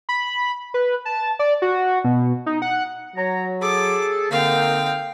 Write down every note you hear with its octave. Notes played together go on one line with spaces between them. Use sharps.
B5
B4
A5
D5
F#4
B2
D#4
F#5
F#3 C#5 A#5
G#4 A4 D6
D3 A#3 C4 D#4 F5 G5